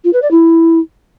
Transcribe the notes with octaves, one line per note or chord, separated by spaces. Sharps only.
F4
B4
D5
E4